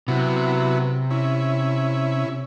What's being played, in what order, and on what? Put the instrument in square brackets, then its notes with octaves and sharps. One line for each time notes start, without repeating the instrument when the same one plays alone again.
[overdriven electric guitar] C3 [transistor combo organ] F#3 B3 E4
[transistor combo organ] C#4 E4